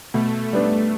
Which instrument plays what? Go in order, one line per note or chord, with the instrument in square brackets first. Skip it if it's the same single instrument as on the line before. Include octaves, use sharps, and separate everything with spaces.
[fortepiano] B2 [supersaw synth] A3
[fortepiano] G3 B3 D4